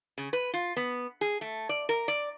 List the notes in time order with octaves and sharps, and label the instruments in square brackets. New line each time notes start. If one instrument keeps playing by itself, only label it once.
[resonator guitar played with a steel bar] C#3
B4
F4
B3
G#4
A3
D5
A#4
D5